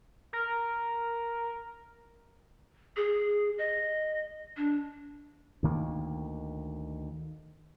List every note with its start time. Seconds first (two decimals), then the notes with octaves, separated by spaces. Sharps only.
0.33 A#4
2.97 G#4
3.58 D#5
4.57 D4
5.63 D2 D#3 A#3